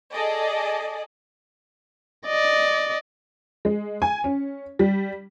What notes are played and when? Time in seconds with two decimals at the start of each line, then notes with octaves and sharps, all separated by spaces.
0.12 G#4 A4 D5 D#5
2.26 D5 D#5
3.65 G#3
4.02 G#5
4.24 C#4
4.79 G3